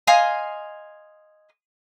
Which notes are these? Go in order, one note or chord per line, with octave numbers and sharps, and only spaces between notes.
D#5 F5 G#5 C6